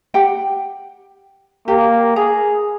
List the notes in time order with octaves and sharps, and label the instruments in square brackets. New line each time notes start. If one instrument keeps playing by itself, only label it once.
[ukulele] G4 F#5 G5
[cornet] A#3 [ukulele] G4
[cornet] G#4 [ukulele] A#5